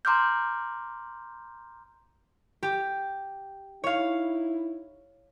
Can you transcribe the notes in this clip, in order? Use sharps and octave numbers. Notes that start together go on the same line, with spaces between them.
A#5 C6 D6 F6 G6
G4
D#4 E4 C#5 F5